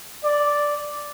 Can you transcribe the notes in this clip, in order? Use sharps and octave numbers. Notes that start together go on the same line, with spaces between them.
D5